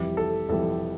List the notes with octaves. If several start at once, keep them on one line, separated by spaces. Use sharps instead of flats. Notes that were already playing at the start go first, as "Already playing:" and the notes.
Already playing: F1 F2 E3 G3 G4
A4
F1 F2 E3 G3 A4